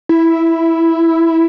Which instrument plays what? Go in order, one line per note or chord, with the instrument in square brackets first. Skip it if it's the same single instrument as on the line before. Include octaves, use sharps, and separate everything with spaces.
[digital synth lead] E4